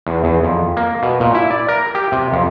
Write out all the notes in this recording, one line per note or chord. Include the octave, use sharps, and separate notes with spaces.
E2
E2
F2
A#3
B2
A#2
E4
D5
A#4
G4
C3
F2